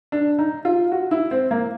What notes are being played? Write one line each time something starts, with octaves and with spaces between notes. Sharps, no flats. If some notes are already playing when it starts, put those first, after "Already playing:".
D4
D#4
F4
F#4
E4
C4
A#3